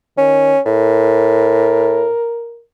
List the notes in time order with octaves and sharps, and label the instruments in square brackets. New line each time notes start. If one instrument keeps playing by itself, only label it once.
[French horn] D#3 [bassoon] C#4
[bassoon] A2 [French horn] A#4